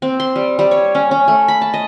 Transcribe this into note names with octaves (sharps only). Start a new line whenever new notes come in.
C4
C6
G3
G3
C#5
C#4
C#4
A3
B5
A5
D#5